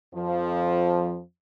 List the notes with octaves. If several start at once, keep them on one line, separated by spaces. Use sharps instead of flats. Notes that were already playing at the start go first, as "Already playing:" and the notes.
F2 F3